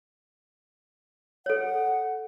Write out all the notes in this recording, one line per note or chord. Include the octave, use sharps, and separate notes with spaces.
A4 C#5 F#5